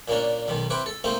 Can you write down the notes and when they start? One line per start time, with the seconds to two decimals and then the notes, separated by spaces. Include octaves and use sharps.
0.08 A#2 A#3 C#4 D4
0.48 B1 B2 D#3
0.70 C4 E4 B4 D6
0.86 A4
1.04 A3 A#3 C4 D#4